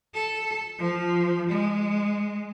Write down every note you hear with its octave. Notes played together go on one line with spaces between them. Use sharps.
A4
F3
G#3